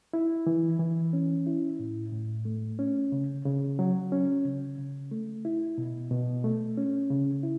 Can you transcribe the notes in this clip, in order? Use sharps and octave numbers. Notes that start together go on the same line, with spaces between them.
E4
E3
E3
C#4
E4
A2
A2
A3
C#4
C#3
C#3
F#3
C#4
C#3
C#3
A3
E4
B2
B2
A3
C#4
C#3
E4